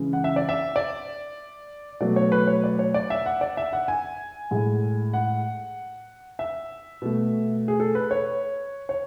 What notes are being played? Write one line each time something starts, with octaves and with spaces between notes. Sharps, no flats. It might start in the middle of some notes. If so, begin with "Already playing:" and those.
Already playing: C#3 E3 G#3
F#5
E5
D5
E5
D5
B2 F#3 A3 D5
C#5
B4
C#5
D5
C#5
D5
E5
F#5
D5
E5
F#5
G#5
A2 G#3
F#5
E5
B2 A3
G#4
A4
B4
C#5
C#5